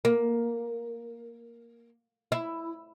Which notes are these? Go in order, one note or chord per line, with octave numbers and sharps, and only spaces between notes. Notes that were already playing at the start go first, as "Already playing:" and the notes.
A#3
E4